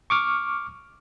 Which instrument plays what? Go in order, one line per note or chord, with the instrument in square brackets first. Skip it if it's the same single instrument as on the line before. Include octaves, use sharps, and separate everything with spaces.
[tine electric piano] C#6 D6 F6